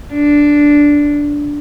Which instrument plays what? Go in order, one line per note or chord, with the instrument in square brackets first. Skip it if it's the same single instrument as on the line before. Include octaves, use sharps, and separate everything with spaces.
[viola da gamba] D4